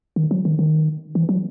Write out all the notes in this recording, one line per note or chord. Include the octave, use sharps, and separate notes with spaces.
D#3
F#3
D#3
D#3
E3
F#3